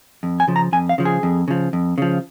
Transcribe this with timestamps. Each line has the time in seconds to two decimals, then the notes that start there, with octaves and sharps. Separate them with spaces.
0.23 F2
0.40 G#5
0.48 C#3 F3
0.56 A#5
0.73 F2 G#5
0.89 F5
0.98 C#3 F3
1.05 G#4
1.23 F2
1.48 C#3 F3
1.73 F2
1.98 C#3 F3